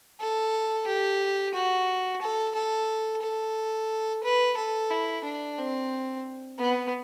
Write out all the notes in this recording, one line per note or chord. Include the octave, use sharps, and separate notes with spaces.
A4
G4
F#4
A4
A4
A4
B4
A4
E4
D4
C4
B3